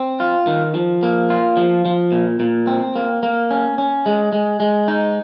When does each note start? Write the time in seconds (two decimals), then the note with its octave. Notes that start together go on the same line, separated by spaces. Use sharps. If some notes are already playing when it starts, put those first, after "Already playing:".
Already playing: C4
0.20 F4
0.47 D#3
0.75 F3
1.03 A#3
1.30 F4
1.57 F3
1.85 F3
2.12 A#2
2.40 A#2
2.67 C4
2.96 A#3
3.23 A#3
3.51 C#4
3.78 C#4
4.06 G#3
4.33 G#3
4.60 G#3
4.88 D#4